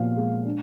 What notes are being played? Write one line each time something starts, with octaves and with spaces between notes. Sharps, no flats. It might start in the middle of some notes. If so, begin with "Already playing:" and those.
Already playing: A#2 F3 B3 F5
G#3
D4